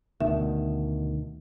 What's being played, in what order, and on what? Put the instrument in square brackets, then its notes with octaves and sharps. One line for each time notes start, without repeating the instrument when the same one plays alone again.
[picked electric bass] D2 B2 D#3 [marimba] E5